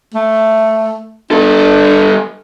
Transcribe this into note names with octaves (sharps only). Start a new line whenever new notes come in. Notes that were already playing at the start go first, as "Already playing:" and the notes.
A3
G3 D4 A4